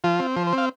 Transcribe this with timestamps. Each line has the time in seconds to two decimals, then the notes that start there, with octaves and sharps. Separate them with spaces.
0.04 F3 F4
0.19 C4
0.36 F3 C5
0.47 C5
0.53 C4 F5